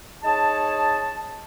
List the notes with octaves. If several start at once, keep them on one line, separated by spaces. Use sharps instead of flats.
D#4 G#4 C#5 A5